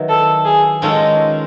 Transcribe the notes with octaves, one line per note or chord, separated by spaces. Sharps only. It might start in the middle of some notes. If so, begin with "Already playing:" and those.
Already playing: D#3 F#3 B3 E4
A4
G#4
D#3 G#3 C#4 F4 A4